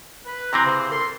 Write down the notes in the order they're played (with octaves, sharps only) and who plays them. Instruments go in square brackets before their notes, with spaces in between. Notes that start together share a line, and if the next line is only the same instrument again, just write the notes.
[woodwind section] B4
[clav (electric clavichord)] C3 E3 C4 [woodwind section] A#5
[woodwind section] C#3 C5
A4 A#4 C6